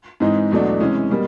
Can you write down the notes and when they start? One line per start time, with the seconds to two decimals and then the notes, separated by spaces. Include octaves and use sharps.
0.20 G#2 E3 G#3 C4 D#4
0.51 E2 B2 F#3 A3 D4
0.80 C3 E3 G#3 C#4
1.10 B2 G3 A#3